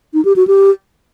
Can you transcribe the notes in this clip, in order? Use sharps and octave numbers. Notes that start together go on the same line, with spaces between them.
D#4
G4
F#4
G4